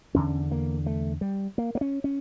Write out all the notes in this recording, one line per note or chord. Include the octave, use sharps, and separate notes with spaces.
E2 D3 C#4
A#3
A3
G3
A#3
A#3
C#4
C#4